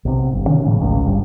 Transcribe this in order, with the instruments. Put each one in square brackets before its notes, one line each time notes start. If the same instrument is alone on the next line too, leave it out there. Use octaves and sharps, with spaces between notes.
[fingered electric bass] B1 C3
G1
B2 D3 D#3 C#4
A2 C#3 F3
G#1 C#2
G1 G2